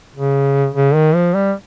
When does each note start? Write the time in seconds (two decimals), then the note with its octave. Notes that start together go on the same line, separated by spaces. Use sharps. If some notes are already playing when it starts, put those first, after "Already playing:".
0.16 C#3
0.75 C#3
0.95 D#3
1.15 F3
1.34 G3